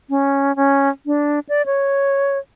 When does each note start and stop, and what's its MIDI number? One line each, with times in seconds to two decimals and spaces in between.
0.10 0.55 61
0.56 0.89 61
1.06 1.40 62
1.49 1.66 74
1.66 2.38 73